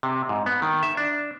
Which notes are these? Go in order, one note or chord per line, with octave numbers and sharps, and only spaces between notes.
C3
G#2
B3
D#3
E5
D4